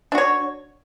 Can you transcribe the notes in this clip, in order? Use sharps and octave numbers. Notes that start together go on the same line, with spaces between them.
D4 F#4 C#5